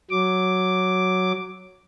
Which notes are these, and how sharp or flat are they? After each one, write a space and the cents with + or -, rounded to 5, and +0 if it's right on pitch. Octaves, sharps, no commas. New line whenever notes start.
F#3 +0 D6 +0